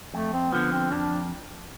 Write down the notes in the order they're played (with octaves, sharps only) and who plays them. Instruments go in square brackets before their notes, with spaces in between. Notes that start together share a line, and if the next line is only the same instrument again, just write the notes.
[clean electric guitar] F2 [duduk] A3
[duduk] C4
[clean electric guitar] D3 F3 [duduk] B3
[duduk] C4
[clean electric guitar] F2 [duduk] D4